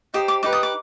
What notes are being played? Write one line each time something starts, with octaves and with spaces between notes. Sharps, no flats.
D#4 G4 C5 D#6
D6
D#4 G4 B4 D6
D#6
D6